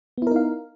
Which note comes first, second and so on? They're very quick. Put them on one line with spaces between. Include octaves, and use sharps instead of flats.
B3 E4 A#4 D#4 F5